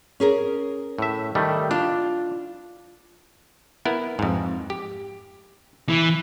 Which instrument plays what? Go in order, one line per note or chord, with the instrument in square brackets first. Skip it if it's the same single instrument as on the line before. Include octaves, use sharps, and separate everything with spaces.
[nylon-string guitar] C#4 G#4 A#4
[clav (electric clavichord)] A2 E5
D#3 G3 A3
[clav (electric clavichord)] D4 [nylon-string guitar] F4
[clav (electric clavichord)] B3 E4 A#4
F2 G#2
G4
[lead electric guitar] E3